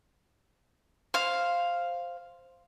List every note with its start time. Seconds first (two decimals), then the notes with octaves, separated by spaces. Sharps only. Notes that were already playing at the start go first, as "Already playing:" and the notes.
1.14 C5 F5